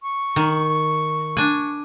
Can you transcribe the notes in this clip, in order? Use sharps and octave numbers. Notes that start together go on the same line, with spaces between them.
C#6
D#3
D4 G#5